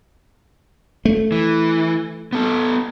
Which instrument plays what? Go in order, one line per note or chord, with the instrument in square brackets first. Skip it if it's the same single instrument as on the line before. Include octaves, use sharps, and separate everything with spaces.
[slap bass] A3
[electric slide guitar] E3
B3 A4